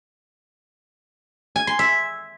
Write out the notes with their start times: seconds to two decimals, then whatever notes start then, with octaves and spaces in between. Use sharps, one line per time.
1.56 G#5
1.67 C6
1.79 E5